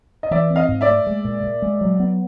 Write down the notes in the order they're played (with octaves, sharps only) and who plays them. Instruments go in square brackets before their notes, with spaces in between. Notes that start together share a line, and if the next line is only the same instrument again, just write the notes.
[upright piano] D#5
[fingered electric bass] E3 [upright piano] D5 E5
[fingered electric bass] C4
[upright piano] D#5 F5
[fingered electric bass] G#2
[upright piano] D5 E5
[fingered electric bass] A3
G#3
A#2
A#2
G#3
F#3
B3